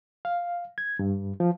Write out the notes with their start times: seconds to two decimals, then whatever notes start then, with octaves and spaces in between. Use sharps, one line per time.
0.25 F5
0.78 G#6
0.99 G2
1.40 F3